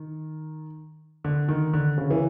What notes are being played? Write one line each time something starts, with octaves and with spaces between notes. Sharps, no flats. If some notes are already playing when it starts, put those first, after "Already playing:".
Already playing: D#3
D3
D#3
D3
C#3
E3